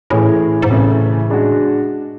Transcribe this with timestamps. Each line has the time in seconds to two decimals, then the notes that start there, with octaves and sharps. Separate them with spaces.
0.10 A2 E3 A3 C#4 E4 G#4
0.62 G#2
0.70 A2 C#3 E3 A3 E4
1.30 G#3 D4 F#4